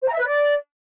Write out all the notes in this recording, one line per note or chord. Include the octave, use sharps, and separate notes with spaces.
C5
A#5
E5
B4
D5